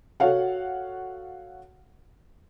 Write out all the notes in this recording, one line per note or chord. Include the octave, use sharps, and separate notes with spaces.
F#4 A4 C#5 F5 F#5